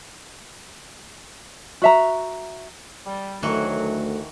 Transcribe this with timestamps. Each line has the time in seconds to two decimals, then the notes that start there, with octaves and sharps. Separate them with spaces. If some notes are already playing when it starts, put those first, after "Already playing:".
1.82 F#4 E5 A#5
3.06 G3
3.43 D2 A2 D#3 E3 F#3 A3 F#4